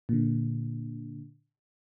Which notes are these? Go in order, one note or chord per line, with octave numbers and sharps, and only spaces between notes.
A#2 D3